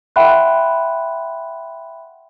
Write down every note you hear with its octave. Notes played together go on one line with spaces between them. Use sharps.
E5 F#5 G5 B5 C6 F#6